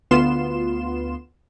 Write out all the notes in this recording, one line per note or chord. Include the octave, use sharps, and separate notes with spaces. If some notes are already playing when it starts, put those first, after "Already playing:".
D2 B3 F4 C6 E7